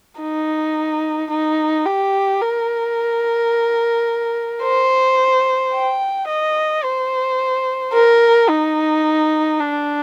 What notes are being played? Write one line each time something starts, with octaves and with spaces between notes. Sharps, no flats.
D#4
D#4
G4
A#4
C5
G5
D#5
C5
A#4
D#4
D4